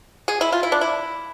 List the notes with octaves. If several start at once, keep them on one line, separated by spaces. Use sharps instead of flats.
G#4
E4
F4
E4
D4
E4